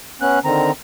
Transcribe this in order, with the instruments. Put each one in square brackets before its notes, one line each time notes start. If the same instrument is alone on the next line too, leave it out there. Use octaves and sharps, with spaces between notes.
[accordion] B3 C#4 F#6
D3 D#3 C4 A#5